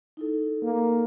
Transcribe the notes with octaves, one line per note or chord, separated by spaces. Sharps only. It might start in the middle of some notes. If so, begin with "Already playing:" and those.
D#4 E4 A4
A#3